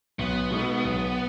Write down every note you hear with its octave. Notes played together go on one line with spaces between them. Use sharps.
B1 B3
B2 G#3 D#4 A4
B1